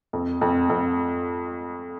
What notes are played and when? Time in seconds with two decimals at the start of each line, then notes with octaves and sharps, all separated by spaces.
0.13 F2
0.41 F2
0.70 F2